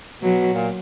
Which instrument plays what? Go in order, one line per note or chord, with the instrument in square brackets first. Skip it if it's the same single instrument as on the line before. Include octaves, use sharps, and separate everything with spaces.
[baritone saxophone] B2 [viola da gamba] F#3
[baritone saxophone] A#2